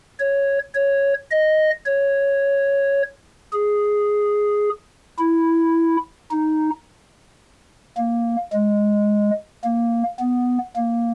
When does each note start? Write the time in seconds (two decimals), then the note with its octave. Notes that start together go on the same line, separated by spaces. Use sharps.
0.20 C#5
0.75 C#5
1.31 D#5
1.86 C#5
3.53 G#4
5.19 E4
6.31 D#4
7.97 A#3
8.53 G#3
9.64 A#3
10.20 B3
10.76 A#3